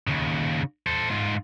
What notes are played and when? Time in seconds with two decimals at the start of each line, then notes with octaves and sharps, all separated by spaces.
0.07 D#2 C#3
0.87 A4 C5
1.10 G#2 F4